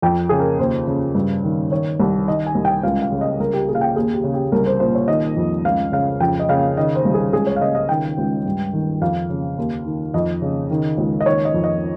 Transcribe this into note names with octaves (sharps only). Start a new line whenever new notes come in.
F2 G5
C#3 G#4
A#4
D#2 C5
C#3
G2
D#3
D#3 C#5
C2
D#3 D#5
G#5
C2
G5
C#2 F5
F5
C#3
D#5
C2 A#4
G4
A#2 G#4
F5
G5
D#2 G#4
G4
C#3
G4
C2 A#4
C5
A#2 C5
C#5
D#3 D#5
F2
C#2 F5
C#3 F5
F2 G5
D#5
C#3 F5
D#3 D#5
C5
C2
G#4
C#2 G#4
C#5
F5
C#3 D#5
D#5
D#3 G5
C#2
G2
D#3
F2 F5
C#3
D#2
D#3
F2 D#5
C#3
D#3
C#2
D#5
D#3 C#5
D#5
F2
D#5